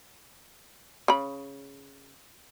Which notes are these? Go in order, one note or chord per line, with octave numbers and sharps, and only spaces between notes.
C#3 B5